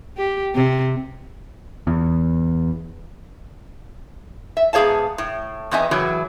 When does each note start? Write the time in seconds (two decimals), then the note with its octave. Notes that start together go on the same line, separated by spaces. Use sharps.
0.17 G4
0.54 C3
1.87 E2
4.57 E5
4.73 G#2 B3 G#4 C#5 F5 A5
5.18 A2
5.71 E2 B3 C4 D#5 E5 G#5
5.91 A2 C#3 E3 F#3